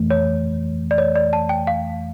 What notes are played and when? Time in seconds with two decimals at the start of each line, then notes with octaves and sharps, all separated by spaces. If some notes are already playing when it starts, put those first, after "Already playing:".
Already playing: F2 E3 A3
0.11 C#5
0.91 D5
0.98 C#5
1.16 D5
1.33 A5
1.49 G5
1.67 F5